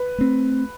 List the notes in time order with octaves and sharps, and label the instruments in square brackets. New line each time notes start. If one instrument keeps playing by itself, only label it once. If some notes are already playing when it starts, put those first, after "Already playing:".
Already playing: [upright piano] B4
[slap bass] A3 C4